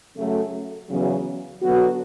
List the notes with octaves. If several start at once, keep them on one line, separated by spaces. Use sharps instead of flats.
F#2 C#3 F#3 A3
E2 C#3 F#3
D3 F#3 B3 F#4